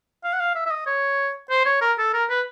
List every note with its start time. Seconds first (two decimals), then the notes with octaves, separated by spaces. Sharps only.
0.24 F5
0.33 F#5
0.40 F5
0.55 E5
0.66 E5
0.71 D#5
0.86 C#5
1.50 C5
1.65 C#5
1.82 A#4
1.98 A4
2.13 A#4
2.30 B4